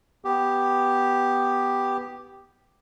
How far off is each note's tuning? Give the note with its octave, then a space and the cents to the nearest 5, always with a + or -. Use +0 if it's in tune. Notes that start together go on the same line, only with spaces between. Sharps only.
B3 +0 G4 +0